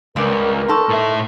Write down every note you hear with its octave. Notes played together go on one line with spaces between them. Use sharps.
C#2 G2 A#4 B4 D5
D#4 A4 C6 C#6
A2 E5